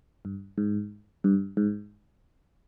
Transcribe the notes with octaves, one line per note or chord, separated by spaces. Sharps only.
G2
G#2
G2
G#2